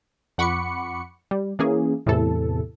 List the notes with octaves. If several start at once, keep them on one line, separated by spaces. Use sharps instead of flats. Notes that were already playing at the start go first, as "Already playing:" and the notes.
F2 F#5 B5 C#6 D6 C#7
G3
E3 A#3 C#4 G#4
E2 A2 C3 E3 A4